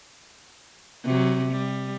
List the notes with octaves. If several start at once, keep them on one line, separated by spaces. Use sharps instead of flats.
C3 F#3
G3